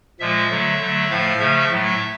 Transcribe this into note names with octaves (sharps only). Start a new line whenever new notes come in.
A#2 F3 G#3 E5
D3 F#3 A3
D3 F#3 A3
A2 F3 A3 F5
C#3 F3 A3 E5
A2 F#3 A3